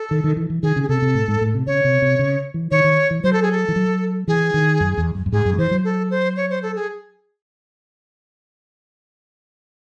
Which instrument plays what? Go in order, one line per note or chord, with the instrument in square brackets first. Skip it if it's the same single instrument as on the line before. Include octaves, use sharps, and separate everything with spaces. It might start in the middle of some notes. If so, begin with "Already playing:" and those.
Already playing: [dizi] A4
[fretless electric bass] D#3
D#3
E3
E3
[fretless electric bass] D#3 [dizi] G#4
[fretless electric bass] C#3
[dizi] G#4
[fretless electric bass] C3 [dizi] A4
[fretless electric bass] C3
A2
G#2
A2
C3
[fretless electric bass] C#3 [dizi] C#5
[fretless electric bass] C3
C3
C#3
E3
[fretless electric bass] D#3 [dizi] C#5
[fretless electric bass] D#3
E3
[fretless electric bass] F#3 [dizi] C5
[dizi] A4
G#4
A4
[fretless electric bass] E3
F#3
[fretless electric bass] E3 [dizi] G#4
[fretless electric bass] D#3
F#2
E2
F#2
F#2
[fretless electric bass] G#2 [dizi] G#4
[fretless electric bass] F#2
F#3
[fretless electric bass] E3 [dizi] C5
[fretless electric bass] F#3
[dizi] A4
C5
C#5
C5
A4
G#4